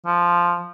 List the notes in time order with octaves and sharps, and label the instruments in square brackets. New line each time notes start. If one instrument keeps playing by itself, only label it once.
[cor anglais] F3